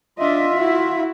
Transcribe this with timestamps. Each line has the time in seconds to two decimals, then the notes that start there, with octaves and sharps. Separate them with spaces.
0.19 D4 F4 D#5 E5
0.55 E4 F#4